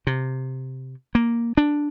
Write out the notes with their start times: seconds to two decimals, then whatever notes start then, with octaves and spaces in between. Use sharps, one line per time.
0.07 C3
1.15 A#3
1.57 D4